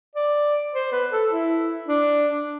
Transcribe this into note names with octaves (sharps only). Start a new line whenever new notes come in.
D5
C5
B4
A4
E4
D4